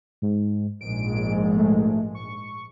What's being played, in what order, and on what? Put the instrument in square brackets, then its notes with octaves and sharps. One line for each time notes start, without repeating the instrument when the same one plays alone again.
[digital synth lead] G#2
[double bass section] A#1 G#2 G#3 [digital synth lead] D7
[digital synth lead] A3
C#6